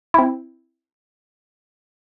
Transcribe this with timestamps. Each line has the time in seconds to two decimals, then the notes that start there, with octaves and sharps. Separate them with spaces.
0.14 C4 E4